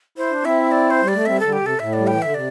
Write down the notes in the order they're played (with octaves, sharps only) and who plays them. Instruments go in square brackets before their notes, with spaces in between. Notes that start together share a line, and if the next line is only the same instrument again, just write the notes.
[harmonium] E4 [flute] C5
[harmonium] D4
[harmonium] C4 E4 [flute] E5
[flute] D5
C5
[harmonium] G3
[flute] D5
[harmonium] A3
[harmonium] G3 C4 [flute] E5
[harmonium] D3 G3 [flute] A4
[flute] G4
[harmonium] C3 [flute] A4
[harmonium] A2 [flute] E5
[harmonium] G3 [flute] D5
[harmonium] E3 [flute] G5
[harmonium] D3 [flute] E5
[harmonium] C3 [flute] D5